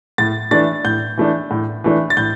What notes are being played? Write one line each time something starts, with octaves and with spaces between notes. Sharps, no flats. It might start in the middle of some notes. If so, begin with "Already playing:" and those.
A2 A6
E3 A3 D4 A6
A2 G6
E3 A3 D4
A2
E3 A3 D4
A6
A2 G6